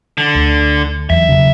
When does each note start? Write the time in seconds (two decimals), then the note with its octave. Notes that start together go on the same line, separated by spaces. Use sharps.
0.18 D3
0.35 D2
1.10 E2 F#3 E5
1.28 E1 C#3 F#3